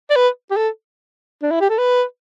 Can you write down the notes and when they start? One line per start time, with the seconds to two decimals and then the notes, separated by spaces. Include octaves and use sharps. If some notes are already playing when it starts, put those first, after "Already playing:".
0.10 D5
0.16 B4
0.51 G4
0.57 A4
1.43 D4
1.51 E4
1.61 G4
1.70 A4
1.78 B4